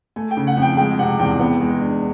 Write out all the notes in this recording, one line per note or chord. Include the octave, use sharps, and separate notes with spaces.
A3 G#5
G5
C#3
F#5
F2
G5
G#3 G5
C3 F#5
E2 G5
B3
G#3
D4